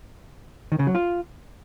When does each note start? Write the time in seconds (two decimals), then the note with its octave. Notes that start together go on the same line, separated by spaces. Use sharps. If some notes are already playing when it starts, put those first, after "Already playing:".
0.72 D#3
0.79 C#3
0.87 F#3
0.95 F4